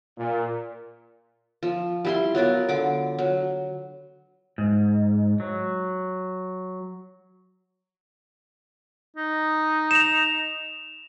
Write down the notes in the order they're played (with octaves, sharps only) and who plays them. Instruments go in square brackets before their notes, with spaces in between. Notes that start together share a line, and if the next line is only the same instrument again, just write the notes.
[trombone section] A#2
[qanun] F3
G3 E4 C6
F#3 B3 F4 A#4
D3 D6
F#3
[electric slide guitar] G#2
F#3
[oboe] D#4
[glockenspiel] E7 F7